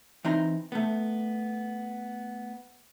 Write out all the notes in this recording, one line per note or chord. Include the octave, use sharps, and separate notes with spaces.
E3 C4 D#4 E4 A#5 C6
A3 B3